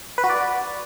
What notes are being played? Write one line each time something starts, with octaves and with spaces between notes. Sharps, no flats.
B4
F#4
D5